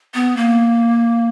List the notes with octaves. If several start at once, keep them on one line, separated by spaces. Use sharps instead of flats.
B3
A#3